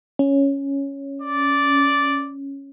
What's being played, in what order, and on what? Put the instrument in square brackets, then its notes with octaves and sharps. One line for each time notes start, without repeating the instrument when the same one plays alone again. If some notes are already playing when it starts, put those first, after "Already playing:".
[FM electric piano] C#4
[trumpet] D5